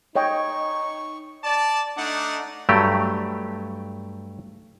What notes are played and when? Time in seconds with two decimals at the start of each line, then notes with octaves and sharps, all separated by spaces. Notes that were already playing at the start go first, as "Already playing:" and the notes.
0.16 D#4 C#5 D#5 G5 C#6
1.44 D5 A5
1.98 A3 D4 D#4 F#5
2.69 G2 F#3 A3 G4